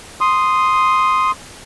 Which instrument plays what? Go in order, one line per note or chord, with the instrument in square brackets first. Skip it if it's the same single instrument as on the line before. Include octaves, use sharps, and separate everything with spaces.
[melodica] C6 D#6